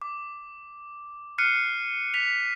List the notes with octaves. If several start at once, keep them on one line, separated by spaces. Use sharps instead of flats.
D6
F6 F#6 C7 C#7 D#7
B6 F7